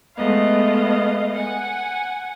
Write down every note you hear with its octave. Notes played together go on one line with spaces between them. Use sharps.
G#3 A3 B3 D#5 F5
F#5 G#5